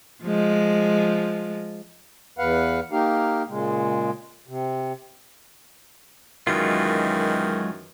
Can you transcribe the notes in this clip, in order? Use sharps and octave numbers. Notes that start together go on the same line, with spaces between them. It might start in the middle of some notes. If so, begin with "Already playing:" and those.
F3 G#3
E2 B4 F5 F#5
A#3 D#4 G4 F5
A#2 C#3 G#3
C3
F#2 D#3 E3 F#3 G#3 F4